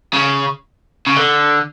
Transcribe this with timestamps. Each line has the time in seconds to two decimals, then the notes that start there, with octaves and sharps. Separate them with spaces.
0.13 C#3
1.07 C#3
1.17 D3